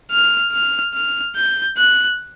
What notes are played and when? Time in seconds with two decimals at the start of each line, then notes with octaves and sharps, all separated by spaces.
0.11 F6
0.53 F6
0.94 F6
1.36 G6
1.78 F#6